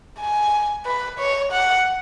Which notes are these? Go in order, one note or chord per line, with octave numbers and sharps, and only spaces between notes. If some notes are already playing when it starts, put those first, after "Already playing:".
G#5
B4
C#5
F#5